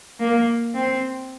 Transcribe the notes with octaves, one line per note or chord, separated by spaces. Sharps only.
A#3
C4